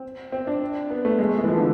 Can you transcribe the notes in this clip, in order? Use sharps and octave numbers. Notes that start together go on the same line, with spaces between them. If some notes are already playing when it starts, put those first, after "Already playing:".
Already playing: C4
C4
D4
B3
A3
G#3
A3
G#3
E3
F3
D3